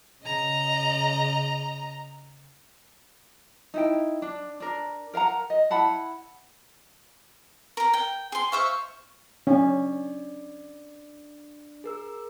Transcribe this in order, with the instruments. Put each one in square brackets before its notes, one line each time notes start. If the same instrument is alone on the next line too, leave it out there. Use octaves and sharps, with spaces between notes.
[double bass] C#3 [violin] D#5 A#5
[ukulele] D#4 E4 G5
D4
D4 A#4
A#4 F5 F#5 A#5
D#5
E4 F#5 A5 B5
[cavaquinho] A#4 A#5
G5
G#4 C6
[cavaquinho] C5 E5 F5 [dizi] C#6
[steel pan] C#4 [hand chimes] D4 D5
[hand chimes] G#4 A#4 E6